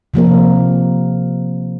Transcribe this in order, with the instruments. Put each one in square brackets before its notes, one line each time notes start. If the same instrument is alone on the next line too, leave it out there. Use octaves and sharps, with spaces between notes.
[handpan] C3 F3 A#3 A#4